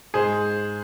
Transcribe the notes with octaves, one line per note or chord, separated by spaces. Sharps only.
G#2 G#4 C5